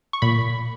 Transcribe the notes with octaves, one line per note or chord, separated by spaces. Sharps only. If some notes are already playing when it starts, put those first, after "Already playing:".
C#6
A#2 B5